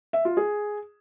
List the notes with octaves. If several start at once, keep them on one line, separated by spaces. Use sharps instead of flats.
E5
F4
G#4